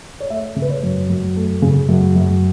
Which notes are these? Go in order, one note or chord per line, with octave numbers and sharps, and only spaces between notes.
C#5
A3 E5
C#3
B4
C#5
F#2
F#2
A3
C#3
F#2
F#2